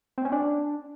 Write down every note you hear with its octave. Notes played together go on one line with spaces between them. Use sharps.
C4
C#4
D4